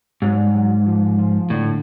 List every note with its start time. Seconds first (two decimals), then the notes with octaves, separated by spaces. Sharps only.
0.22 G#2 F#3
0.38 G3
0.54 F#3
0.86 F3
1.18 F3
1.50 A2 D3